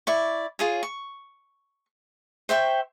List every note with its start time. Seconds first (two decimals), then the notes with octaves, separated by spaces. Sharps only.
0.07 E4 D5 C#6
0.59 F4 G#4 C#5
0.83 C#6
2.49 C5 E5 G5 C#6